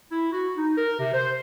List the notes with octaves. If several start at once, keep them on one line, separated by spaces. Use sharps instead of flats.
E4
F#4
D#4
A#4
C3
C5